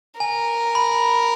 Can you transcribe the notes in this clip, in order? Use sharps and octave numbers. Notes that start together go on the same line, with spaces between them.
A#4 G#5
B5